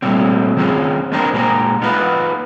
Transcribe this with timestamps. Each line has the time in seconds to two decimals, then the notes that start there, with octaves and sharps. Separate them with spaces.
0.02 A#2 F#3 G3 A3 C4
0.56 D#3 C4 C#4 F4 G#4
1.12 B3 C4 D4 G4 A#4 C5
1.33 A#2 G#3 G4 B4 A#5
1.81 B3 D#4 F4 B4